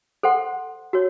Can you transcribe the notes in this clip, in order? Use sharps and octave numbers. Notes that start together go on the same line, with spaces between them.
A4 C5 F#5 C6
F#4 C#5